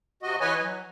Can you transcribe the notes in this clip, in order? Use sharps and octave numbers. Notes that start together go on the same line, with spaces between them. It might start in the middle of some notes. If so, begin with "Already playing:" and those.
C3 F#4 D#5
E3 B4 C#5 D#5 G#5
F#3